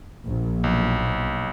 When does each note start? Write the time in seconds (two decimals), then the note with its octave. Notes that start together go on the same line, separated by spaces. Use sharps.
0.24 A#1
0.64 B1